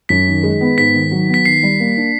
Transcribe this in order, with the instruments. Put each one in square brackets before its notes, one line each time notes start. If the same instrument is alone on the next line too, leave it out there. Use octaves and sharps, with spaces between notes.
[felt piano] F#2 [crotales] B6
[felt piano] D#3
G#3
B3
[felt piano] G#2 [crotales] B6
[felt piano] D#3
F#3
B3
[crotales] B6
[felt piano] D#3 [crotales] C7
[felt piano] G3
A#3
D4